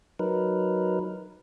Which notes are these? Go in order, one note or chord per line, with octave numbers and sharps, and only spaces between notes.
F#3 D#4 A#4 B4